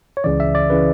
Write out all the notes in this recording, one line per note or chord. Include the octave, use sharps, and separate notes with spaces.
C#5
C#2 C#3 E3 D5
E5
D5
C#3 E3 B4